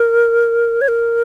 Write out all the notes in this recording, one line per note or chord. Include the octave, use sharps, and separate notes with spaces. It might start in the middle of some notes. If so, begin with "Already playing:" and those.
Already playing: A#4
C#5
A#4